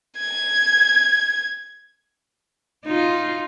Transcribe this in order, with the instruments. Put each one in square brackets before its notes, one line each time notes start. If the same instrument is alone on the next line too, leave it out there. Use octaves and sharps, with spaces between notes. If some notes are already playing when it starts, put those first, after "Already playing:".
[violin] G#6
[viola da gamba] D#4 F4